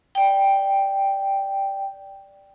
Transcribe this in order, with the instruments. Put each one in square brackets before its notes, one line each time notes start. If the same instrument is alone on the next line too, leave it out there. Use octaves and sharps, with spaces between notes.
[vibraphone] D5 G5